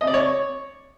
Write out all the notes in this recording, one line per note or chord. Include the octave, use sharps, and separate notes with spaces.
D#5
D5
C#5